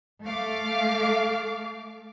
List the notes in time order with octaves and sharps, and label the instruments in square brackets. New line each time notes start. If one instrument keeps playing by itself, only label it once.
[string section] A3 F5 D6